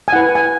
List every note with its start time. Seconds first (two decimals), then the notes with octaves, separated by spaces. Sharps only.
0.08 G#5
0.13 E4 B4 F#5
0.35 G#5